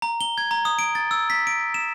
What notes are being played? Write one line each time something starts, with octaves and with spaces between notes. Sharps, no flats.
A#5
G7
G#6
A#5
D#6
D7
A6
E6
B6
D7
E7